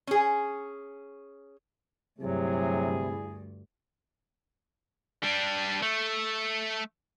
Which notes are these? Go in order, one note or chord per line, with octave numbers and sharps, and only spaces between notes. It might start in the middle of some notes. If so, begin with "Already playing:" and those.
C#4 G#4
D2 G2 C3 F#3 E4 G#4
G3 D4
A3